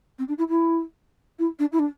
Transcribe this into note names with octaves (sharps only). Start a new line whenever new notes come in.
C4
D4
E4
E4
E4
D4
E4
D4